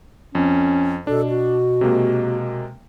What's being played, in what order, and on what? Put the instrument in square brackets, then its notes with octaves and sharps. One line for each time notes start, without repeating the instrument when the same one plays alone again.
[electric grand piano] F2 [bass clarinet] C#4
[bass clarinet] B2 [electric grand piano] D4 [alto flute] A4
[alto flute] F#4
[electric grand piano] C3 G#3 A#3